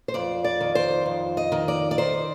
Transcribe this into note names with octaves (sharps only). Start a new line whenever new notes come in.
C5
F2 D5
D5
D#3
C5
F2
D#5
D#3
D5
D5
D#3 C5